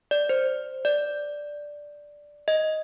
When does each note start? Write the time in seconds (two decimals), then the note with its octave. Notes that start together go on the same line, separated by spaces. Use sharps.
0.11 D5
0.29 C5
0.85 D5
2.48 D#5